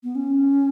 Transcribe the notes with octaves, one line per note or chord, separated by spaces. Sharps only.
B3
C#4